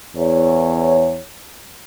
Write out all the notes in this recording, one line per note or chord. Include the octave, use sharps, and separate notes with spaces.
E2 C#5